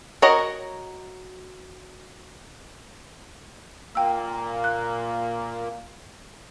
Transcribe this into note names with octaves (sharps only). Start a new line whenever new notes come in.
F#4 A#4 C#5 D#5
A#2 A#3 G5 E6
F#6